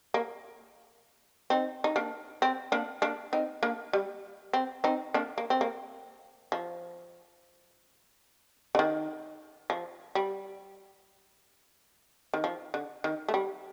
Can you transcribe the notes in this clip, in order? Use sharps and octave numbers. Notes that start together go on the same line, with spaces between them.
A#3
C4 D#4
D#4
A#3 D4
C4
A#3 D4
A#3 D4
C4 D#4
A#3 D4
G3
C4
C4 D#4
A#3 D4
A#3
C4
A#3
F3
D3
D#3
F3
G3
D#3
F3
D3
D#3
A3
G3